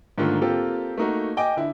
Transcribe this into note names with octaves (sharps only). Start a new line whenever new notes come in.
G#2 D3 D#3 A3 A#3 F4
A#3 C4 F4 G4 A4
A3 A#3 D#4 F#4
D#5 G5 G#5 D6
D3 E4